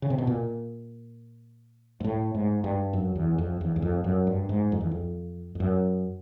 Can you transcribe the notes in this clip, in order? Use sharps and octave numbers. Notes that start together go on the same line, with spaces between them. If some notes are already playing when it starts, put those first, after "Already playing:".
C#3
C3
B2
A#2
G#2
A2
G#2
G2
F#2
E2
F2
E2
E2
F2
F#2
G2
G#2
F2
E2
F2
F2
F#2